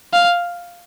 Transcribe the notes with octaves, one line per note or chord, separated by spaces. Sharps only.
F5